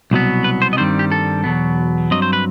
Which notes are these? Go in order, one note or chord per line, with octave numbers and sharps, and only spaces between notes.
C2 B2 F#3 B3
B4
C5
D#5
G2 D#3 G3 C4 C5
G4
A4
E2 B2 F#3 B3
G2 F#3 C4 D#5
C5
B4